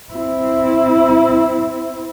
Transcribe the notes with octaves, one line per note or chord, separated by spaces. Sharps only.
C4 E4